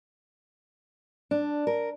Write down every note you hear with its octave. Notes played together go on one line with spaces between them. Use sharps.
D4
A#4